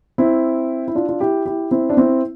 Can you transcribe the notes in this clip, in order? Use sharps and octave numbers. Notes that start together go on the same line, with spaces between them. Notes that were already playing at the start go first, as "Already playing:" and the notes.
C4 E4
E4
D4 F4
F4
E4 G4
E4 G4
C4 E4
D4
C4 E4